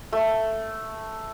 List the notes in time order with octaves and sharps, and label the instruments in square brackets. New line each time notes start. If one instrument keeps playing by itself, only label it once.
[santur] A3